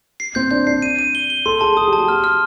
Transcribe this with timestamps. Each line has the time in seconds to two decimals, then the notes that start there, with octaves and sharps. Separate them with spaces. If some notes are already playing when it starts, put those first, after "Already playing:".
0.20 C7
0.35 C4 G6
0.51 D4 G6
0.67 D4 C7
0.82 D#7
0.99 D#7
1.15 G7
1.30 G7
1.46 A4 C6
1.61 G#4 A5
1.77 G#4 D#6
1.88 G4
1.93 A5
1.98 F#4
2.08 G4 F6
2.24 F6